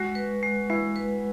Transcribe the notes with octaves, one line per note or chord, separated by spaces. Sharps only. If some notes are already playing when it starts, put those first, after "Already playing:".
Already playing: G#3 F#4
B4
G#3
G#3 E4
B4